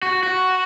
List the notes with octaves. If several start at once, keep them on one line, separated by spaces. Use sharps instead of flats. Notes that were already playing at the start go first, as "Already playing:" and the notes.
F#4
F#4